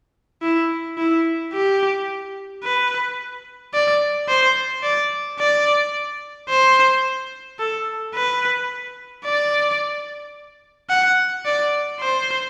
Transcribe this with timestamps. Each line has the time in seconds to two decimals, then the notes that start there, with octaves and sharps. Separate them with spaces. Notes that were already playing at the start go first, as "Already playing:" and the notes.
0.42 E4
0.98 E4
1.53 G4
2.63 B4
3.74 D5
4.29 C5
4.83 D5
5.39 D5
6.49 C5
7.59 A4
8.14 B4
9.25 D5
10.90 F#5
11.45 D5
12.00 C5